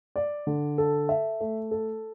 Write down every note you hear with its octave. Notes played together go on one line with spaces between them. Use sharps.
D5
D3
A4
E5
A3
A4